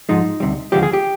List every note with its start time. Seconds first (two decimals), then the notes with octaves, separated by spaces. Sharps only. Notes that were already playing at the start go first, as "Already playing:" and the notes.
0.09 G#2 F3 G#3 D#4
0.40 D2 C3 G3
0.72 D#2 D3 F3 G#3 G4
0.83 G#4
0.93 G4